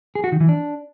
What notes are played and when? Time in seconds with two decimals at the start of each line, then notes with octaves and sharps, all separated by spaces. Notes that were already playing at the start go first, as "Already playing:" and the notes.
0.15 G#4
0.24 F#4
0.32 D#3
0.40 E3
0.49 D4